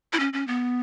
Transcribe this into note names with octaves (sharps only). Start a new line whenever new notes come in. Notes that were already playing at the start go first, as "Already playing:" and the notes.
E4
C#4
C#4
B3